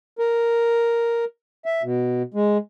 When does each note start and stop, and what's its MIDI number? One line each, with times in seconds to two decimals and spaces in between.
0.19 1.25 70
1.65 1.82 76
1.83 2.22 47
2.34 2.57 56